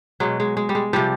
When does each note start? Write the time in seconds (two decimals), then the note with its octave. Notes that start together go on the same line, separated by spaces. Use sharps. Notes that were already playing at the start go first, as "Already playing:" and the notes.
0.20 B2 F#3 G#3
0.40 G#3
0.57 G#3
0.69 G3
0.75 G#3
0.93 C3 F3 G3